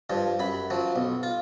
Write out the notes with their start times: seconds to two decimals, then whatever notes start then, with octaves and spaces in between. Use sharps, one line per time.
0.10 G2 F3
0.39 F#2 B5
0.70 F3 F#3
0.96 B1
1.23 F4